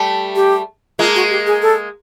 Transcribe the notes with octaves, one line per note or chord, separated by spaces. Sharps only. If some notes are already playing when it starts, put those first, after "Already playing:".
Already playing: G3 A3
G4
G#3 A#3 F4
F#4
G4
G#4
A4